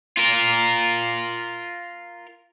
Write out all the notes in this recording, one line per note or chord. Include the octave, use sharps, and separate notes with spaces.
F4 A#4